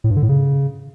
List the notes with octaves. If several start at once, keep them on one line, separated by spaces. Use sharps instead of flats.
A2
G2
D3
A2
C#3